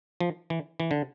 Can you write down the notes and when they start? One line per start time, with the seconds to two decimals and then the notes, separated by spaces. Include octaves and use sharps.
0.21 F3
0.50 E3
0.80 E3
0.91 D3